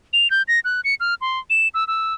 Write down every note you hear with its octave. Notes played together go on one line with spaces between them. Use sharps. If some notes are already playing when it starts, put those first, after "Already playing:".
F7
G6
A#6
F#6
C#7
F6
C6
E7
E6
E6